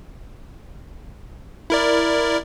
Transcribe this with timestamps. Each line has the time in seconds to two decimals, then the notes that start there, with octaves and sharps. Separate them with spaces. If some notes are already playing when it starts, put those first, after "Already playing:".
1.70 E4 A#4 D5